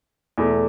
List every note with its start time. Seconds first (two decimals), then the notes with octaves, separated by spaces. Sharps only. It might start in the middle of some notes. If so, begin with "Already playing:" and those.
0.38 E2 B2 A3